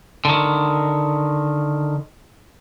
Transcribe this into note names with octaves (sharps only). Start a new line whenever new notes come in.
D3 D#3